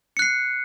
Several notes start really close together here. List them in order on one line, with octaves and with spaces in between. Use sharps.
C#7 F#6 C7